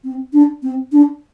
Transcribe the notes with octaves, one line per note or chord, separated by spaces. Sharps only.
C4
D4
C4
D4